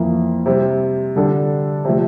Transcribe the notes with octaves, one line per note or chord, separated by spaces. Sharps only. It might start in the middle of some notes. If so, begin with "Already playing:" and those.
Already playing: F2 E3 A#3
C3 G3 C4
D3 G3 D4 A4
C3 F3 A3